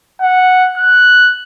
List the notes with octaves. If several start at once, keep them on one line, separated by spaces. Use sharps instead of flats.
F#5
F#6